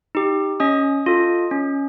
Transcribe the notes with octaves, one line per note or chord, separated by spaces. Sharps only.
D#4 G4
C#4 D#5 D#6
F4 A4
C#4